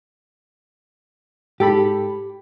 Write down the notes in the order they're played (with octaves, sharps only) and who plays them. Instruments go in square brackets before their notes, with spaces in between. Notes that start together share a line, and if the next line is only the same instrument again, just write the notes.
[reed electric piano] G#2 A4 B5 [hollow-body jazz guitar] G4